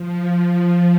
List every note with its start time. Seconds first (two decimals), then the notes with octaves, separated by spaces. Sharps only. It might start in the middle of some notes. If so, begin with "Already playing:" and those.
Already playing: F3
0.52 F3